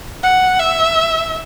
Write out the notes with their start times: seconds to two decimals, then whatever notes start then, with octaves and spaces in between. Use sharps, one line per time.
0.24 F#5
0.59 E5